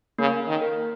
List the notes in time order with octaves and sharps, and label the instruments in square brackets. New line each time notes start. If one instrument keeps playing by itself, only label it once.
[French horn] C#3 [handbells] A#3
[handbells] A#3
[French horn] D#3
[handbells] A#4